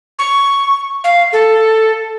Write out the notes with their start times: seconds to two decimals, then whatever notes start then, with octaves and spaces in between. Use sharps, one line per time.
0.19 C#6
1.04 F5
1.33 A4